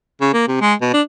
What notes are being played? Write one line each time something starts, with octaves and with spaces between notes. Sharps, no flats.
C#3
A#3
C3
G#3
B2
D4